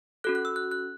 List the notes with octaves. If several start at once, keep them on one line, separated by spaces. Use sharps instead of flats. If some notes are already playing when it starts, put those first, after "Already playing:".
C#4 F#4 A4 F#6
F#6
E6
F#6
F#6